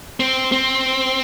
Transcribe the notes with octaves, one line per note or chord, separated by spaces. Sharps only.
C4
C4